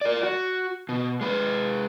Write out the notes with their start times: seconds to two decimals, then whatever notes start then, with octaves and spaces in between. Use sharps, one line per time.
0.01 A#4 D5
0.23 F#4
0.89 B2
1.21 G#3 B4